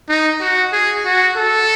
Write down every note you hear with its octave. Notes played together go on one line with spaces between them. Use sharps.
D#4
F#4
G#4
F#4
A4